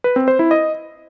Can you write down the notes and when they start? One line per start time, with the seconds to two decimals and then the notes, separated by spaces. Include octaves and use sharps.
0.04 B4
0.16 C4
0.28 C5
0.39 E4
0.51 D#5